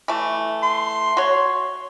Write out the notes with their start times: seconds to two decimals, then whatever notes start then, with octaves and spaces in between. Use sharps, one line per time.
0.08 E3 A3
0.63 C6
1.17 F#4 C#5